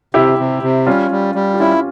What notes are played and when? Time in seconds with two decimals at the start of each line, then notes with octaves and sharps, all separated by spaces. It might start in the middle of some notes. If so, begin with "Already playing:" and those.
0.14 C3 E4 G4
0.39 C3
0.63 C3
0.87 G3 C#4 F4
1.11 G3
1.35 G3
1.54 G4
1.59 C#4 E4 F4